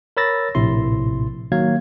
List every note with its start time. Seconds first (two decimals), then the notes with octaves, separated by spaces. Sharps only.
0.17 A#4 C#5 B5 E6 A6 A#6
0.55 A#1 A2 C3 E4 C6
1.52 D#3 F#3 A#3 F5 G#6